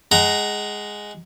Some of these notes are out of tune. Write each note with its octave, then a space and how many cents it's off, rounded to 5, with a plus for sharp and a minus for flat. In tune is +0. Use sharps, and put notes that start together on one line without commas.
G#3 +0 F#5 +25 A#5 +0